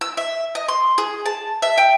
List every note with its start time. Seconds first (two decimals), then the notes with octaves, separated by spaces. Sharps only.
0.01 E6
0.17 E5
0.55 D#5
0.68 C6
0.98 G#4
1.26 A5
1.62 E5
1.78 G5